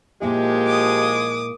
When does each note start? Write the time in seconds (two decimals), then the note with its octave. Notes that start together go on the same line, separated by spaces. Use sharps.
0.22 A#2 F3 G#3 A#3 E4 G4
0.67 D6 D#6